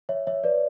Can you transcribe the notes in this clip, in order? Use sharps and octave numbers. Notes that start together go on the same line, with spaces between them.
C#5 E5
C#5 E5
B4 D5